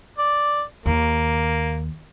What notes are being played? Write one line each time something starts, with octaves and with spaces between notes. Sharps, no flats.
D5
D#2 A#3